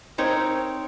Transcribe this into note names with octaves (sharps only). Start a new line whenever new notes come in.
C4 D#4 A#4 C#5